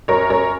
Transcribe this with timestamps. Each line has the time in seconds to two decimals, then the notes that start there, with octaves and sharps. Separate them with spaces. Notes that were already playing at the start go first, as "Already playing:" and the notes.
0.08 F#2 A#4 C#5
0.29 F#2 A#4 C#5